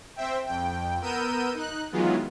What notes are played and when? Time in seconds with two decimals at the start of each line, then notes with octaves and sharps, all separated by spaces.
0.16 C4 C5 E5 G5
0.47 F2 G5
1.02 B3 A#4 E6 G6 D#7
1.54 D#4 F#6
1.92 D#3 E3 F#3 G#3 B3 F4